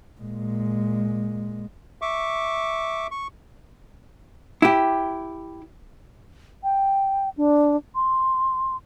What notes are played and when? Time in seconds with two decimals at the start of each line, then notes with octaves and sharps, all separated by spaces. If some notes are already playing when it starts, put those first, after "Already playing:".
0.21 A#2 G#3
2.02 E5 C#6 D6
3.11 C#6
4.62 E4 G4
6.64 G5
7.37 D4
7.95 C6